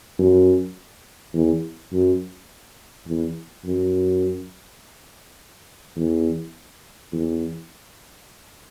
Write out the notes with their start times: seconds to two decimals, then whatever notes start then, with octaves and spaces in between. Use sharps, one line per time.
0.19 F#2
1.34 E2
1.93 F#2
3.08 E2
3.65 F#2
5.96 E2
7.13 E2